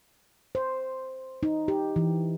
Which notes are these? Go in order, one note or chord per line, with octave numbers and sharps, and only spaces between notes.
C5
D#4
G4
E3